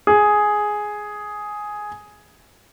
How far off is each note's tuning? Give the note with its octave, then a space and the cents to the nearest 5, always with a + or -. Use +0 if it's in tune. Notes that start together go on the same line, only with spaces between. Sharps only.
G#4 +5